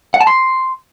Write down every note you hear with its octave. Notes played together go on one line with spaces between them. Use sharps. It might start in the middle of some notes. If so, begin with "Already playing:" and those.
F#5
A5
C6